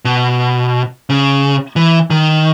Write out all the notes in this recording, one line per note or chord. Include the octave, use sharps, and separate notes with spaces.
B2
C#3
E3
D#3